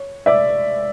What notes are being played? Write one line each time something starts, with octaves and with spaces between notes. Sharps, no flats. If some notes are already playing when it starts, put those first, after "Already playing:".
Already playing: C#5
D5 E5